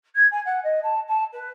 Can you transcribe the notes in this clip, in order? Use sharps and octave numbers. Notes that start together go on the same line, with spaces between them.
G#6
G#5
F#5
D#5
A5
A5
B4